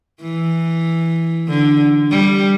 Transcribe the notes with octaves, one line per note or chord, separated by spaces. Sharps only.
E3
D3
G3